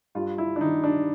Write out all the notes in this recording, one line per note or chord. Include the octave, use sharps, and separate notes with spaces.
G2 F4
E4
D4
D#3 D#4
D4